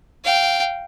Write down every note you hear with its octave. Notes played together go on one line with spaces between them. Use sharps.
F5 G5